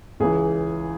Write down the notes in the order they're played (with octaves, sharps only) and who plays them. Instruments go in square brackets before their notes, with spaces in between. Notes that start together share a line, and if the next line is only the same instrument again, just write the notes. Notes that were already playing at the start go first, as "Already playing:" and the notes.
[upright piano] C#2 C#3 E3 G#4